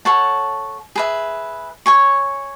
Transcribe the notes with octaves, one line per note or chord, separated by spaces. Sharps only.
A4 C#5 F#5 A5
G#4 B4 E5
C#5 G#5 C#6